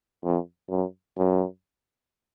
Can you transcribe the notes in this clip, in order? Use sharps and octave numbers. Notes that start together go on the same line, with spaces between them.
F2
F#2
F#2